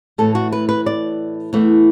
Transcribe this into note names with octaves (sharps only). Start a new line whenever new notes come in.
A2 E3 A3 A4
F#4
B4
B4
D5
E2 E3 A3